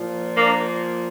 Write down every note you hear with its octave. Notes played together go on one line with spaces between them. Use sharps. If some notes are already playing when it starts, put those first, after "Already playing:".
Already playing: A#2 F3
A#3 D4